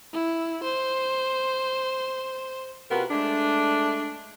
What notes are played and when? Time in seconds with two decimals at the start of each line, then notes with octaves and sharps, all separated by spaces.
0.13 E4
0.64 C5
2.91 C3 B3 F4 F#4 A#4
3.11 G#3 A3 D4